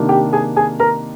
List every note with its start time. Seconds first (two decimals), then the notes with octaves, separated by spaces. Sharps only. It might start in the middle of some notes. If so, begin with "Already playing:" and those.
Already playing: C3 D#3 A#3 D4
0.09 G4 G5
0.33 G#4 G#5
0.56 G#4 G#5
0.80 A#4 A#5